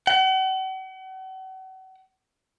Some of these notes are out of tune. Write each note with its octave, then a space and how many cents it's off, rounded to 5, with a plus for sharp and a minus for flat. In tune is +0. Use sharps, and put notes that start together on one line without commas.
F#5 +40